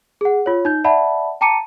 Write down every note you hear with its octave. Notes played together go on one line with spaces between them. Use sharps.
G#4 F#5
F4 C#5
D#4 G6
D5 E5 F#5 A5 B5
G5 A5 A#5 D6 C#7 D#7